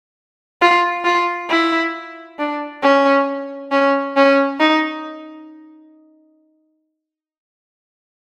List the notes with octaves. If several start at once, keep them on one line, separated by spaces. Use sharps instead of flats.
F4
F4
E4
D4
C#4
C#4
C#4
D#4